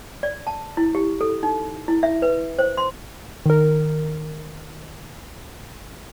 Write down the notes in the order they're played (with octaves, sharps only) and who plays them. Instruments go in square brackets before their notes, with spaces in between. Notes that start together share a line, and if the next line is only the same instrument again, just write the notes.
[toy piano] D5
A5
E4
G4
A4
D#4
E4
E5
B4
C5
C6
[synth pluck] D#3 A#4